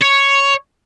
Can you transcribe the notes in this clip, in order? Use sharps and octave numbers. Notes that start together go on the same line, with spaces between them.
C#5